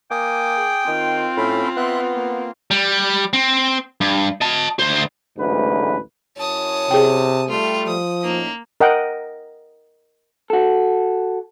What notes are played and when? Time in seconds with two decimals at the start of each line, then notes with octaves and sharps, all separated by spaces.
0.11 A#3 G5 G#5 D6 D#6
0.55 G#4
0.87 D#3 C4 F4
1.37 A2 C#4 A4 B5
1.77 B3 E5 C6 F#6
2.15 A#3
2.71 G3
3.33 C4
4.01 G2
4.41 D#5 A5
4.79 D2 C5
5.38 A1 D2 G#2 F#3 B4
6.37 F#2 E4 C#5 A5 D#6
6.91 C3 G#4 G5
7.48 G3 A3 F4
7.87 F3 D#6
8.24 A2 A#3 C#4 D#4
8.81 A#4 D#5 F#5 G5
10.50 F#4 A4